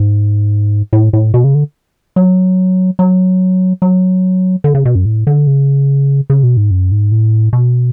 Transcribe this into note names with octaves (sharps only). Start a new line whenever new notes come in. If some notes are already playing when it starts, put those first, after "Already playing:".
Already playing: G#2
A2
A2
B2
C#3
D3
F#3
F#3
F#3
D3
C#3
B2
F#2
A2
D3
C#3
C#3
B2
G#2
F#2
G#2
A2
B2